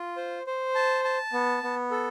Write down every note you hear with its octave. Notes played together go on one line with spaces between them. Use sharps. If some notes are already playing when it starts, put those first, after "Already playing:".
Already playing: F4
C5
C5
A5
A5
B3
B3
A4